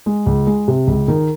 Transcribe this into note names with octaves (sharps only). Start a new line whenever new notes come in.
G#3
C#2
G#3
C3
C#2
D#3